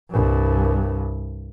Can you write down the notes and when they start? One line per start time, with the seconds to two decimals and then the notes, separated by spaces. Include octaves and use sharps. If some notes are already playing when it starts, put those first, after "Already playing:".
0.10 C2 G2